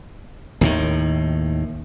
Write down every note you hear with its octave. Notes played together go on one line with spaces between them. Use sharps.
D#2 A2 D#3